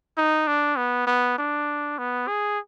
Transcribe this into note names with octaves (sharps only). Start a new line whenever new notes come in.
D#4
D4
B3
B3
D4
B3
G#4